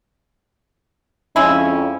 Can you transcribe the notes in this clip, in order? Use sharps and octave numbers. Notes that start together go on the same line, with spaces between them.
F2 G#3 C#4 E4